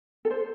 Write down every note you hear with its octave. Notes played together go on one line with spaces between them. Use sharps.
A4
C5